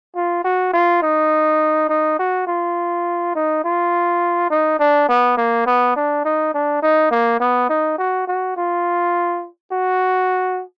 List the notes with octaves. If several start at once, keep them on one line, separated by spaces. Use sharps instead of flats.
F4
F#4
F4
D#4
D#4
F#4
F4
D#4
F4
D#4
D4
B3
A#3
B3
D4
D#4
D4
D#4
A#3
B3
D#4
F#4
F#4
F4
F#4